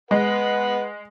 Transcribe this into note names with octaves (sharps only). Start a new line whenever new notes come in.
G#3 B4 F#5